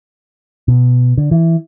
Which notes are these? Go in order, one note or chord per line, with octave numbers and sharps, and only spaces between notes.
B2
D3
E3